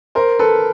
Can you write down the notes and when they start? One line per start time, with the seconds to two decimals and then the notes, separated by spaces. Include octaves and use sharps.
0.15 A#4 C5
0.39 A4 B4